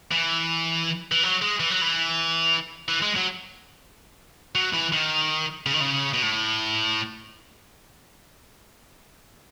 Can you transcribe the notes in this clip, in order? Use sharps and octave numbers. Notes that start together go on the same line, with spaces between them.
E3
E3
F#3
G#3
E3
F#3
E3
E3
G#3
F#3
F#3
E3
D#3
C#3
D#3
C#3
B2
A2